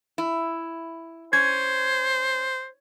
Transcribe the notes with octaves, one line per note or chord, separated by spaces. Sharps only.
E4
C#4 C5 G#6